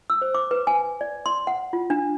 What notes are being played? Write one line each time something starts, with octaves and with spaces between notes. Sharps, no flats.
E6
C5
D6
B4
G#5
D5
C6
F#5
F4
D4